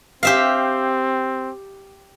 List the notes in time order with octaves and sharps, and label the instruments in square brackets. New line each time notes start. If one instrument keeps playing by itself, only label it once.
[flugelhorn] C4 [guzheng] G4 E5 F5